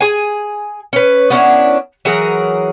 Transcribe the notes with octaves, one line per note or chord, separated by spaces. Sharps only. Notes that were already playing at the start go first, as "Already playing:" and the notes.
G#4 G#5
C#4 B4
B3 C#4 D4 E4
E3 F#3 G#4 A#4